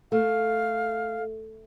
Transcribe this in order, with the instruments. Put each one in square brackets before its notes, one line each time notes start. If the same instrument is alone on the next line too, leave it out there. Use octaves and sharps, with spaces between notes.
[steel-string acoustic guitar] A3 [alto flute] F5